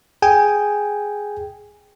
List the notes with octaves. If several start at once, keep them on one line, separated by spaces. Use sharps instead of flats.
G#4 G5 G#5